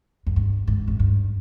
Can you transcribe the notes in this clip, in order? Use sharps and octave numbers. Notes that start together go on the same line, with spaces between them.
F#2
G2
G#2
F#2
G2